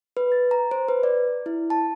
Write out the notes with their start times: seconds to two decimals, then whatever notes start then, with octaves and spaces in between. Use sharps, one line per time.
0.17 B4
0.32 A6
0.51 A#5
0.71 C5
0.88 B4
1.03 D5
1.46 E4
1.70 A5